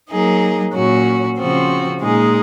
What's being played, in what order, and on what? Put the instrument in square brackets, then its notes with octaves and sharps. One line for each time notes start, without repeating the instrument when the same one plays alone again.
[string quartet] F#3 A#3 D#4 G#4
A#2 F#3 C#4 F#4
C#3 F3 C4 F#4
A#2 G#3 D#4 G#4